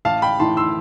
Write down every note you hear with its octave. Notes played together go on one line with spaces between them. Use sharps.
A1 F5 A5
G5 B5
A2 E3 A5 C6
C6 E6